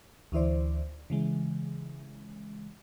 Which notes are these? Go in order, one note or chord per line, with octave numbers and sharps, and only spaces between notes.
D2 E3 E4 C5 D5
C#3 E3 G#3